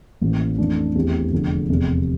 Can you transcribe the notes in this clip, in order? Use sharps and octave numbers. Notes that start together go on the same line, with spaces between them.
A1 A2 E3 A#3
F2 E3 A3 D4
E2 E3 A3 C4 G4
F1 E2 D3 F3
F1 E2 C3